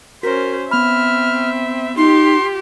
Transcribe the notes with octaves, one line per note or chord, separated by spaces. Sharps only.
C#4 F#4 A#4 C5 B6
B3 C4 E5 B5 F6
D#4 F4 G4 C6